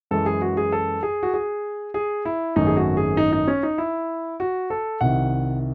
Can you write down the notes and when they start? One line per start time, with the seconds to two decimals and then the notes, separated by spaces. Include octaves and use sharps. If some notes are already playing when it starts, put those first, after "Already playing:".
0.11 F#2 E3 G#3 A4
0.26 G#4
0.42 F#4
0.57 G#4
0.72 A4
1.03 G#4
1.23 F#4
1.34 G#4
1.94 G#4
2.25 E4
2.56 G#1 F#2 D#3 A3 D#4
2.67 G#4
2.77 F#4
2.97 G#4
3.17 D#4
3.33 D#4
3.48 C#4
3.63 D#4
3.78 E4
4.40 F#4
4.70 A4
5.01 C2 C3 D#3 F#5